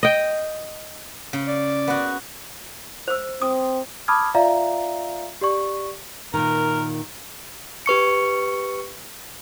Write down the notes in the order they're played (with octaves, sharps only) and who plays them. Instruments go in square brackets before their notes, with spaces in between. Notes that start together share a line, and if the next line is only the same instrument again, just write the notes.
[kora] D#5 G5
[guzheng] C#3
[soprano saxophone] D5
[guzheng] B3 F#4
[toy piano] C5 E6
[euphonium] C4 [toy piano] D#6
[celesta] A5 B5 D6 D#6 F6 G#6
F4 D5 E5 F5 A#5
G4 D5 C#6
[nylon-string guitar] A#2 D#3 [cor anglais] A#4
[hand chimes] G4 B4 C#6 C#7